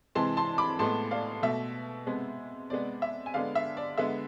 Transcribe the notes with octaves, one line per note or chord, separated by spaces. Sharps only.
C3 E3 G#3 A5 C6
A5 C6
B5 D6
A2 G#3 B3 A5 C6
D5 F5
B2 A3 E5
C3 G#3 B3
C3 G#3 B3 D5
E5
G#5
D3 G#3 B3 D5 F5
E5
D5
D3 G#3 B3 E5